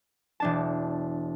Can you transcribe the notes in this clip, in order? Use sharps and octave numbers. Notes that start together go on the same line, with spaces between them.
E1 D4 A5